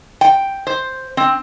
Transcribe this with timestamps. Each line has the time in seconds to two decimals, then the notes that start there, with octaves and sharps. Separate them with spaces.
0.21 G5
0.67 C5
1.17 C4